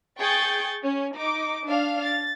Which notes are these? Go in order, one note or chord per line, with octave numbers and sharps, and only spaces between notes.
G#4 G5 C#6 G6 A6
C#4
D#4 D6
D4 F5
A6